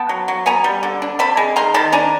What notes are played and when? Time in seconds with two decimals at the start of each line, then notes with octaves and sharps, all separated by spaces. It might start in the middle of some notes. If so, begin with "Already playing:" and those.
Already playing: B3 G5 A5
0.09 F#3
0.28 F#3
0.46 B3 G#5 A#5
0.64 G3
0.83 D3
1.02 D4
1.19 C4 A5 B5
1.37 G#3
1.56 D#3 A#5 C6
1.74 D#3 A5 B5
1.92 D4 G#5 A#5